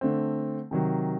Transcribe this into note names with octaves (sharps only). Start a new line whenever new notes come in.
D3 A3 C4
C3 D#3 F#3